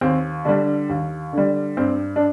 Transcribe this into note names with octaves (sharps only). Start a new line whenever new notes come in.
D#2 C4
D3 G3 D4
D#2
D3 G3
G2 C4
D4